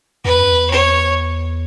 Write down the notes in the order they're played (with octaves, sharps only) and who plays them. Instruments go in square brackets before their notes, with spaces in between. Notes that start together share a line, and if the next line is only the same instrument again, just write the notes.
[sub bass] E2 [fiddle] B4
[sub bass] F#2
E2
[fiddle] C#5